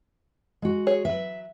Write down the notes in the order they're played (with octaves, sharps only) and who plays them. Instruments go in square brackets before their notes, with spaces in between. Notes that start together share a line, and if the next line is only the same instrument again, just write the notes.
[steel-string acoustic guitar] G#3 F#4
[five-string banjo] G#4 C#5
[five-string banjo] F#3 B4 [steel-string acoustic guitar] E5